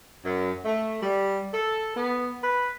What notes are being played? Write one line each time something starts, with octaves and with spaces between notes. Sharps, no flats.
F#2
A3
G3
A4
B3
B4